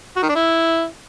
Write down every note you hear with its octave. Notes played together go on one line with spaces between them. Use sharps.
F#4
D#3
D4
E4